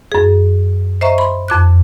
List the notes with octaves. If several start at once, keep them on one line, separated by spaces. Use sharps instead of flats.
F#2 G#4
C5 D#5 E5 A#5 C#6
B5 C6
F2 D6 F#6